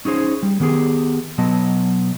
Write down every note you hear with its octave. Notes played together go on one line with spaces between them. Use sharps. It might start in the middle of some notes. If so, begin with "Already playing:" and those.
C#4 D#4 G#4 C5
G3
D#3 B3 G4 G#4
B2 F#3 B3 D#5 A5